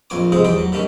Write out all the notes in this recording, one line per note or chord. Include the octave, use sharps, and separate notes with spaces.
A#1 F2 G#5 C#6 D6
G#2 C3 G#3 G#4
E2 G3 G#4 G5
F#3
D#3 G3 A3 C#4